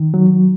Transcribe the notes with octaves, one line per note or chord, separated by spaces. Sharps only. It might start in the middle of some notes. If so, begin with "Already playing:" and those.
Already playing: D#3
F#3